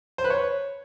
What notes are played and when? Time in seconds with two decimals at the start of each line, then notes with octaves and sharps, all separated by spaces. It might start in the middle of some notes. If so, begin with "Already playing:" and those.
0.18 C5
0.24 B4
0.30 C#5